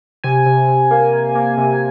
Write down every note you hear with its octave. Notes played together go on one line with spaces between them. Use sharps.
C3 G#5
C3
C3
A#3
A#3
A#3
C3